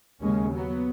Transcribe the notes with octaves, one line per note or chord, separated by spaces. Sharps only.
D#2 C#3 G#3 C#4
F#3 B3